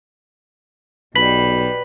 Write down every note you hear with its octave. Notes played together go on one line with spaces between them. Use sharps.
B1 B2 G3 B4 B6 F#7